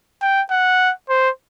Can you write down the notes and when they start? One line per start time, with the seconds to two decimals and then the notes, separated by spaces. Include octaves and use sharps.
0.22 G5
0.51 F#5
1.09 C5